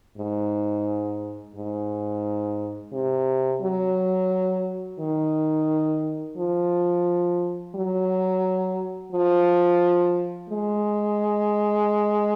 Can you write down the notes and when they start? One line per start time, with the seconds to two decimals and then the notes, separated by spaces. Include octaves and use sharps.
0.18 G#2
1.56 G#2
2.93 C3
3.62 F#3
5.00 D#3
6.37 F3
7.76 F#3
9.12 F3
10.50 G#3